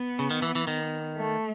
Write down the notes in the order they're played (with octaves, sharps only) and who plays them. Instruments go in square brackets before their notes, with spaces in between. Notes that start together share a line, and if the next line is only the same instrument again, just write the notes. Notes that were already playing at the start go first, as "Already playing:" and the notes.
Already playing: [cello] B3
[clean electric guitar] C#3
D#3
E3
E3
D#3
[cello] A3